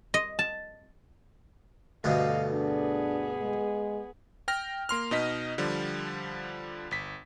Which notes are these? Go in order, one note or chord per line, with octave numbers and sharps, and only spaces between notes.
D#5
A5
D2 G2 B2 D#5 F5
B3 D4 G#4
G#3
G5 F6 A#6
A#3 C6 F6
B2 D#4 D#5 B6
D3 F3 G3
G1 B6